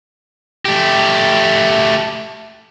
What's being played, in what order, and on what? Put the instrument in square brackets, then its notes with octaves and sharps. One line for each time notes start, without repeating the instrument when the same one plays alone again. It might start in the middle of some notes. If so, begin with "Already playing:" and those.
[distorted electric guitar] A3 G4